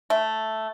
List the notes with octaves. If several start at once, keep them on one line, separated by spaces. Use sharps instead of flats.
A3